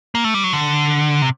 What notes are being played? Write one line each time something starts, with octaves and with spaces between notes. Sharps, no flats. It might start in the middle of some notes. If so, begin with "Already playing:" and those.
A#3
A3
G3
F#3
D3
C3